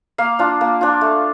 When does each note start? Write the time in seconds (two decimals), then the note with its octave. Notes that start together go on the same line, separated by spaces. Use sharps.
0.18 A#3 F5
0.39 D4 F4
0.61 A#3
0.81 D4 F4
1.01 A3